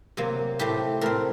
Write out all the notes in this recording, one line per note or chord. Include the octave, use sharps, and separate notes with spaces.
C3 F#3 A#3
A2 A3 C4 G4
A2 A3 C4 A#4